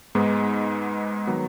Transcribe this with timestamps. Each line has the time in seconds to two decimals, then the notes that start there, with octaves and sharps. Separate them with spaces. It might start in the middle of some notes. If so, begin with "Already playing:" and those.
0.15 G#2 G#3 B3 D#4
1.27 D#3 F#3 B3